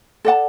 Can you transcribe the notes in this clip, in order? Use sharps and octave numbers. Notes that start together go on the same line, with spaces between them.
A4 D5 F#5 A5